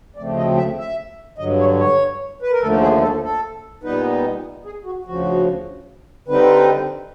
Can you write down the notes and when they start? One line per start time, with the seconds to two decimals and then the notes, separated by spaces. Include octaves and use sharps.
0.16 D2 C#3 F3 A3 C4 D5
0.37 D#5
0.57 E5
0.78 E5
1.38 G2 D3 F#3 D#5
1.59 C#5
1.79 C#5
2.42 B4
2.51 A#4
2.61 D#2 D3 F3 A3 A4
2.81 G#4
3.01 A4
3.22 A4
3.83 A#2 G3 B3 D#4 B4
4.65 G#4
4.85 F#4
5.05 D2 C#3 F3 F#4
6.27 D3 G3 C4 D#4 B4